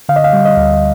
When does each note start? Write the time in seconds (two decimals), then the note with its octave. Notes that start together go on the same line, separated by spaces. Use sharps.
0.09 D3 F5
0.16 D#5
0.24 F5
0.33 G3
0.45 D#5
0.57 D2